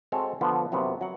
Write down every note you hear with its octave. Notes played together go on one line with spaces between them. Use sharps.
G#3 C4 F#4 A4 C#5
D3 F3 B3
F#2 C3 F#3 B3 F4
F#3 F#5